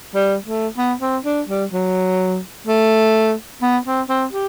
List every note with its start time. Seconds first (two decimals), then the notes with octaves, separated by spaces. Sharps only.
0.14 G3
0.46 A3
0.77 B3
1.01 C4
1.25 D4
1.48 G3
1.72 F#3
2.67 A3
3.62 B3
3.85 C4
4.09 C4
4.33 G4